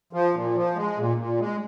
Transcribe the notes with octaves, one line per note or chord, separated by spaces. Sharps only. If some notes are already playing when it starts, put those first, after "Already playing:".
F3
A#2
F3
G#3
A#2
A#2
G#3